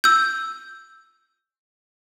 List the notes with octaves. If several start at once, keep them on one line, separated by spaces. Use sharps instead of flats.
E6 G6